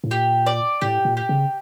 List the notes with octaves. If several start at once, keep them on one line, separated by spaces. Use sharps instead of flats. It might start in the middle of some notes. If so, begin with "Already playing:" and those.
A2
A#2 G4
D5
A2 G4
A#2
G4
C#3